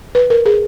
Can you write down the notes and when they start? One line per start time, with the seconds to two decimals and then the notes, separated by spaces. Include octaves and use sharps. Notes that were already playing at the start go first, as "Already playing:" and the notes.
0.15 B4
0.30 A#4
0.46 G#4